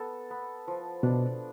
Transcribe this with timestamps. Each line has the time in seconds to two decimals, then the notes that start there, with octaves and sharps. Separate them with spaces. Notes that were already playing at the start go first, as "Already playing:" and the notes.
Already playing: B3 A4
0.30 B3
0.67 F3
1.03 B2 D4